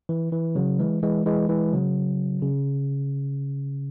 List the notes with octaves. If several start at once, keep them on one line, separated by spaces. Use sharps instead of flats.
E3
E3
C#3 F#3
E3 G#3
E3 G#3
E3 G#3
E3 G#3
C#3 F#3
C#3